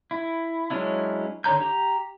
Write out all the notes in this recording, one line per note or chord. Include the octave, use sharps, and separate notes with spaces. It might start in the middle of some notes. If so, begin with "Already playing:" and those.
E4
F#3 G#3 C#4 D4 E4
D3 D#3 C#5 A#5 G6
G4 A#5